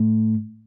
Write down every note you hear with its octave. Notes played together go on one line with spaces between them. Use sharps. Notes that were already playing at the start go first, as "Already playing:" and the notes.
Already playing: A2